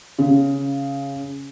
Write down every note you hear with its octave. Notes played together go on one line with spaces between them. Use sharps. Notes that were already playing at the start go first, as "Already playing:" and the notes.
C#3